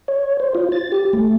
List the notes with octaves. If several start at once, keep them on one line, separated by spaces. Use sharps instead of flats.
C#5
C5
F4
A6
G4
A3